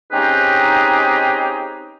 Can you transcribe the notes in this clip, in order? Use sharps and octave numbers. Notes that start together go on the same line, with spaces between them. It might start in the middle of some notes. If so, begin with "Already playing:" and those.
C4 C#4 D#4 G4 G#4 B4